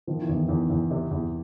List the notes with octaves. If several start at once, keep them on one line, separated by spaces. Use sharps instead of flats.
D#3 F3
E3
E2
D#3
E2
E2
C3
E2